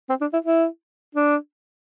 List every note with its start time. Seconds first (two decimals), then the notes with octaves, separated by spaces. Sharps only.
0.09 C4
0.21 D4
0.33 E4
0.45 E4
1.15 D4